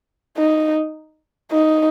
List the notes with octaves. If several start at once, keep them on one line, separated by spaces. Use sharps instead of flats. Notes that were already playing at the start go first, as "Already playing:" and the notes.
D#4
D#4